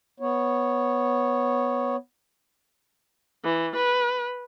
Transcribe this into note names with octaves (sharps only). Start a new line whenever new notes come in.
B3 C#5
E3
B4